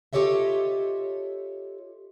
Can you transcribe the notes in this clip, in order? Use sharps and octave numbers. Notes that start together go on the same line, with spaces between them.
F4 G4 A4 C#5 D#5 E5